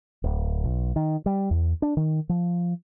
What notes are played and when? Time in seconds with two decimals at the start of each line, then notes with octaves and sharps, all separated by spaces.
0.24 D1
0.64 B1
0.96 D#3
1.26 G3
1.51 E2
1.82 D4
1.97 D#3
2.29 F3